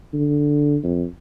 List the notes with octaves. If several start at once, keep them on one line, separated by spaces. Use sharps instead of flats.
D3
F2